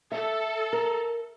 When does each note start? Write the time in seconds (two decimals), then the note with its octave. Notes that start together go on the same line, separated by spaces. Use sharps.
0.12 A4 E5
0.73 A#4